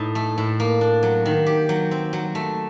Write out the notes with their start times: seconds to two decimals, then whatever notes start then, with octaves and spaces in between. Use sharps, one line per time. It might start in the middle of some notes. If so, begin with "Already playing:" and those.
Already playing: A2 D#4
0.15 A3
0.38 A2
0.60 A#3
0.81 D4
1.03 F#3
1.26 D#3
1.46 G4
1.69 F#3
1.91 C4
2.13 F#3
2.35 A3